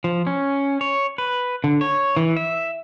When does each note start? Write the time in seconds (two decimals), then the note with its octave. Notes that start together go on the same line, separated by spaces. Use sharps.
0.04 F3
0.27 C#4
0.81 C#5
1.18 B4
1.64 D3
1.81 C#5
2.17 E3
2.37 E5